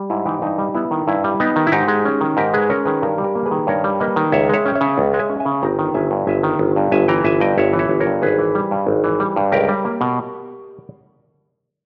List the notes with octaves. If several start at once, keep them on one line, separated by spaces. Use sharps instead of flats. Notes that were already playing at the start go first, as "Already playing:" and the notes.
Already playing: G3
G#2 E4
E3 D#4 G4
G2 D#4
G3
B3 E4
D#3
G2 E4
G3
B3 D#4 G4
D#3
E4
G#2 D#4 G4
G#3
C#4
D#3
G#2 G4 A#4
G#3 G#4 B4
C#4 A#4 C#5
D#3 G#4 B4
G2 G4 A#4
G3
G4 A#4
A#3
G#4 B4
D#3
G2 A#4 C#5
G3
A#3 B4 D#5
D#3
C#2 C#5 E5
G#3 C#5 E5
C#4 G5
C#5 E5
C#3
C#2
G#3
E5 G#5
C#4
E5 G#5
C#3
G1 G5 A#5
D#3
G1 E5 G#5
G2
G1 E5 G#5
D#3
G1
G2
G1 E5 G#5
E3 G5 A#5
G1 E5 G#5
G2 D#5 G5
G1 C#5 E5
E3
C#5 E5
G1
A#4 C#5
G2
G#1 G#4 B4
E3
G3
G2
G#1
E3
G3
G2
C#2 G4 A#4
G3
A#3
B2